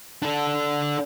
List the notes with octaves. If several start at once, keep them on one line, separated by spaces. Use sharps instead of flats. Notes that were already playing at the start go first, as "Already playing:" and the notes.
D4 A4